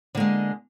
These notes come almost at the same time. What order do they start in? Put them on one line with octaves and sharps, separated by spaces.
D3 A#3 G#3